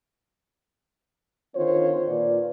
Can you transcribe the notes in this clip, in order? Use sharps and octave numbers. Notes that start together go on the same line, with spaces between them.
D3 D#3 C4 F4 C5 C#5
A#2 F4 B4 D5